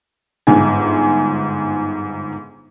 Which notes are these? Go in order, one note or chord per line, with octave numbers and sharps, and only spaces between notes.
G1 G#2 G#5